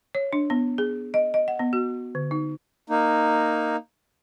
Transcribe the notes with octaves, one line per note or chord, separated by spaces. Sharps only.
C#5
D4
B3
G#4
D#5
D#5
F#5
B3
F#4
D3
D#4
A#3 D#4